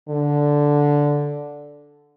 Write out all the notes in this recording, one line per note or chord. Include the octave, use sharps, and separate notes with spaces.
D3